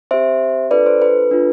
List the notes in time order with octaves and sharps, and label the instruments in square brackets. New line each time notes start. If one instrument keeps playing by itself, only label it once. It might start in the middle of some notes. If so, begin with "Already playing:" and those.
[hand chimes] C4 G4 C5 E5
D4 F4 A4 B4 D5
C5
B4
D4 F4 A4